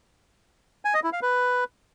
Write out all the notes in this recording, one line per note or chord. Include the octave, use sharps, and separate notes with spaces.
G#5
D#5
E4
F5
B4